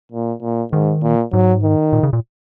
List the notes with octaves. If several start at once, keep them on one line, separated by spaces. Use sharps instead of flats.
A#2
A#2
G#2 D#3
A#2
G#2 F#3
D#3
A#2
C#3
A#2